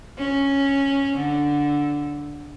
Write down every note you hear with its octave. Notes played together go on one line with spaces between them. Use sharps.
C#4
D3